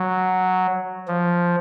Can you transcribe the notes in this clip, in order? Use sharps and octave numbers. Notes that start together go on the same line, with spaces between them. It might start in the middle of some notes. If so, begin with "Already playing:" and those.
Already playing: F#3
F3